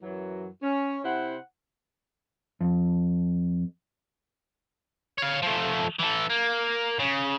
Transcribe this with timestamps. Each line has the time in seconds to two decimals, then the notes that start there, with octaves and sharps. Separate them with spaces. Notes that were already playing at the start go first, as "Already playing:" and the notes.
0.03 F#2 E3 F#3
0.63 C#4
1.05 C3 E4 C5 F#5
2.61 F2
5.18 C#5 F5
5.42 F3 A3
5.99 E3 A4
6.30 A#3
6.99 C#3